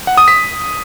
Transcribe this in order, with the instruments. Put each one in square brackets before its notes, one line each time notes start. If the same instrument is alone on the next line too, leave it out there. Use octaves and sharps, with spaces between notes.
[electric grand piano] F#5
D#6
B6